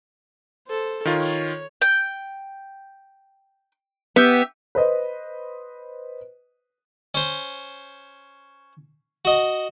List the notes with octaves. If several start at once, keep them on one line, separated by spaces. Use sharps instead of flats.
A4 C5
D#3 F4 C#5
G5
B3 G4 E5
B4 C5 D#5
C#4 C5
F#4 D#5